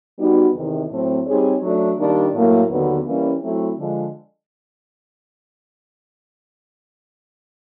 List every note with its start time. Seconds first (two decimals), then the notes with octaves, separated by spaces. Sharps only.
0.18 G3 B3 D#4 F#4
0.54 E2 C3 D#3
0.90 A2 F#3 A3 C4
1.26 G3 C4 D#4 G#4 C#5
1.62 F#3 A3 D4
1.97 D#3 G3 A#3 D4
2.33 A2 F#3 A#3
2.69 D#2 D3 F#3 B3
3.05 E3 G3 A#3 C#4
3.41 F#3 A3 C4 E4
3.77 D3 F3 G#3